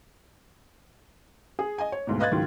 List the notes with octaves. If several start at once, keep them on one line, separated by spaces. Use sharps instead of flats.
G#4
D#5 G#5
C#5
D2 G#2 B2
B4 D#5 F5 F#6 G#6 A6
C#2 G#2 D#3 F#3